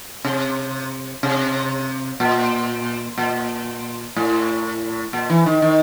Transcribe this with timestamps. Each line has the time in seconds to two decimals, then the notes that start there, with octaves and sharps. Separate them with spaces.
0.24 C3
1.23 C3
2.20 A#2
3.18 A#2
4.16 A2
5.13 A#2
5.30 E3
5.46 D#3
5.62 D#3